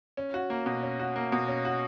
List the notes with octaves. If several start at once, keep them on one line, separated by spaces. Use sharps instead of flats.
C#4
F#4
A#3
B2
C#4
F#4
A#3
B2
C#4
F#4